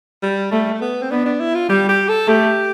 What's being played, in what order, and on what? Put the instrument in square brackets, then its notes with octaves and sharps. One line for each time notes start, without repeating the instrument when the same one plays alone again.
[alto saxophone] G3
[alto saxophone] G3 [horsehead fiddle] A3
[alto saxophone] A3
B3
C4
[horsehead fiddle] B3 [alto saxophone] D4
[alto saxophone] D4
E4
F4
[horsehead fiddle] G3 [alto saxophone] G4
[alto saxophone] G4
A4
[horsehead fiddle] A3 [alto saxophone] G4